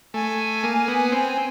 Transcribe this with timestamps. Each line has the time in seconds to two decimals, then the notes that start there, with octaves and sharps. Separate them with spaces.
0.14 A3 G#5
0.63 A#3
0.88 B3
1.12 C4